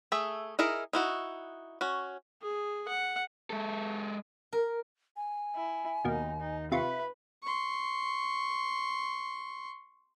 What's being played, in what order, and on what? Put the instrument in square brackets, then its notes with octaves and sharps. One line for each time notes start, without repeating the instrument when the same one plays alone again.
[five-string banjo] A3 G#4 E5
D#4 E4 G#4 A#4
D#4 E4 F#4
C#4 F#4
[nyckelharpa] G#4
F#5
[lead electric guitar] G#3 A4
[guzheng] A#4
[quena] G#5
[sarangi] E4
[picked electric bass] D#2 [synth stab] B2 A#3 [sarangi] D#4
[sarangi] D#4
[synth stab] C3 F4 C#6 [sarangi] B4 [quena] E5
[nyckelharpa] C6 C#6